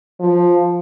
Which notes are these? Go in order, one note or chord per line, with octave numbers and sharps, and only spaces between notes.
F3